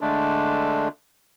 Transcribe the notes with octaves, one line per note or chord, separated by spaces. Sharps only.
D3 G#3 A3 D4